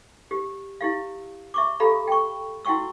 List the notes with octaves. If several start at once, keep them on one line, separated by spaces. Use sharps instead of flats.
G4
E4 G4 F5
E5 C#6 D6
G4 A4 F5 A#5 B5
G5 C#6
E4 F#4 F#5 G5 C#6 E6